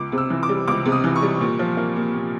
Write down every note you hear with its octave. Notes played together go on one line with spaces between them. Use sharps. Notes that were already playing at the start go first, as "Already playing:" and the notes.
Already playing: C#2 D6
C3
E6
E3
D6
G3
C#2 D6
C3
D#6
E3
C#6
G3
A#2
F3
A#3
A#2
A#2